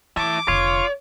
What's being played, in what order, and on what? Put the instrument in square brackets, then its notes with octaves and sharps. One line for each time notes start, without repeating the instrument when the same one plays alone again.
[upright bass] E3 [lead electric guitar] E4 A5 [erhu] D6
[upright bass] F1 D3 [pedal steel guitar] F4 [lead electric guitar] C#5